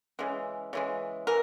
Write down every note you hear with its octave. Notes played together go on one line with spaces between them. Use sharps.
C#3 E3 G#3
C#3 E3 G#3
E3 A#4